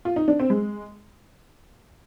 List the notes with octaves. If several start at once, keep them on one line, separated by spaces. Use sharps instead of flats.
F4
D#4
D4
C4
G#3